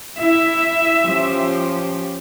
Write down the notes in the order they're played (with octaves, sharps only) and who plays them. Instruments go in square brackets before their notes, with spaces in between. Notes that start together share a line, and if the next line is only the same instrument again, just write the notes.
[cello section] E4 [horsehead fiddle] E5
[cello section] F3 C#4 G4